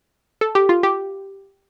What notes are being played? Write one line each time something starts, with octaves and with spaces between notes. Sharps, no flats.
A4
G4
F4
G4